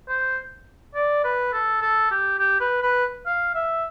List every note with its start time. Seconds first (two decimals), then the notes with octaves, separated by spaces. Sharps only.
0.09 C5
0.95 D5
1.24 B4
1.53 A4
1.82 A4
2.11 G4
2.39 G4
2.61 B4
2.82 B4
3.26 F5
3.55 E5